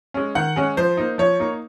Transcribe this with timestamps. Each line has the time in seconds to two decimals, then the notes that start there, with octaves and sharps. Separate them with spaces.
0.14 G#3 C#4
0.35 D#3 F#5
0.56 G#3 C#4
0.77 F3 C5
0.97 A#3 D#4
1.18 F3 C#5
1.40 A#3 D#4